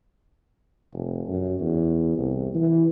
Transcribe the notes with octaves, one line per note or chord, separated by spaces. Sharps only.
F1
F#2
E2
C2
E3